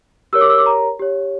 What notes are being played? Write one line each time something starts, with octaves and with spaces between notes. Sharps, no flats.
G4 A#4 C#5 E6
D6
E6
D6
A#5
G4 C#5